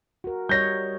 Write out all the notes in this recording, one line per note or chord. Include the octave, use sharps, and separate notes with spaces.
F#4 A#4
G3 C#5 D#5 G6 A#6